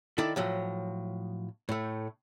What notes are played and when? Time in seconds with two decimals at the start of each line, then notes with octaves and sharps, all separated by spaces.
0.18 D#3 E4 A4 D5
0.36 A2 F3 F#3
1.69 A2 A3